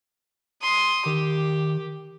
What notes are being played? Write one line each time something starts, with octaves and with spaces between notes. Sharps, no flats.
C6 D#6
D#3 G4